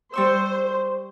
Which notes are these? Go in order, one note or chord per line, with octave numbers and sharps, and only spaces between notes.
G3 C5 C#6 E6